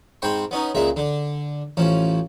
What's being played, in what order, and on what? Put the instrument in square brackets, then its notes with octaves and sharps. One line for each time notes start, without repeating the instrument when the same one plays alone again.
[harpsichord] G#2 C4 G5 B5 C#6
B3 C#4 D#4
C#2 A#2 G#3 E5
D3 D4
A1 F3 C#4